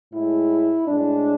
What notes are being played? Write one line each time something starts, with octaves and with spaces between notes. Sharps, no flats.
A2 G#3 E4
A2 G#3 D4